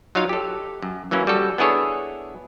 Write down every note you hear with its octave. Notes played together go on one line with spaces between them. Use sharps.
F#3 D#4 F4 C#5 F5
G4 A4
F#2
E3 F#3 A#3 C#4 E4
G3 F#4 A4
B3 D4 E4 G#4 A4 C#5